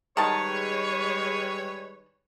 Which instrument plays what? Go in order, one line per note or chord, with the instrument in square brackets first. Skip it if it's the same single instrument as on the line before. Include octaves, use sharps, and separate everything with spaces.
[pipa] D#3 A5 [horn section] G3 G#3 B4 [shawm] C#5 [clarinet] C#6